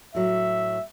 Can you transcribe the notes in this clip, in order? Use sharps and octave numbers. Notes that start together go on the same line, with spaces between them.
A2 F#3 E5